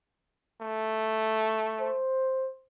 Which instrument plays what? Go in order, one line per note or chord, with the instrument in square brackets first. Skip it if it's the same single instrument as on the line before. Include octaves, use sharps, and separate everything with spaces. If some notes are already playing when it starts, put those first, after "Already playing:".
[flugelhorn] A3
[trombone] C5